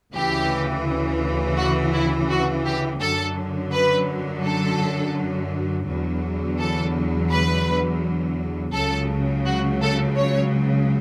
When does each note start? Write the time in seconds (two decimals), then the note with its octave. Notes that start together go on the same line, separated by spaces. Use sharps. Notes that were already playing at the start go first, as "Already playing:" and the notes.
0.13 D2 C#3 E3 G4
1.58 F#4
1.93 E4
2.29 F#4
2.65 G4
3.00 F#2 D3 F#3 A4
3.72 B4
4.44 A4
5.87 E2 D3 F#3
6.59 A4
7.31 B4
8.73 C#2 C#3 F#3 A4
9.46 F#4
9.81 A4
10.16 C#5